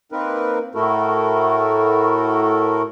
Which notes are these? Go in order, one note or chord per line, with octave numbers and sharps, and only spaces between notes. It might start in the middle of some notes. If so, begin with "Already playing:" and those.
A#3 C4 D#4 A#4 B4
A2 A3 E4 F#4 A4 A#4